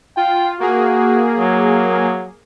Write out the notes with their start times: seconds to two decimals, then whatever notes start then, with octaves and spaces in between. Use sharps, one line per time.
0.17 F4 G5
0.60 A#3 F#4 G#4
1.38 F#3